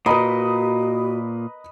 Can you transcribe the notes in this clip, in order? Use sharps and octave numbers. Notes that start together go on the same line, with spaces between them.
A#2 F#4 B4 D#5 A#5 B5 D#6